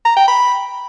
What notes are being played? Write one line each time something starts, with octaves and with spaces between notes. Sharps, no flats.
A#5
G5
B5